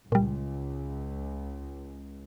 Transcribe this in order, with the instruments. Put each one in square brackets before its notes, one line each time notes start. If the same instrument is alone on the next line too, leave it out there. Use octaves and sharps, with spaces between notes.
[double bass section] C#2 [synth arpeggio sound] A#2 G3